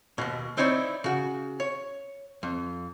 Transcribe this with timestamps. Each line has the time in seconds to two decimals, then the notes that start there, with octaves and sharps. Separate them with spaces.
0.18 D#2 B2
0.57 C4 D#4 E4 C#5 D5
1.04 C#3 F#4
1.60 C#5
2.43 F2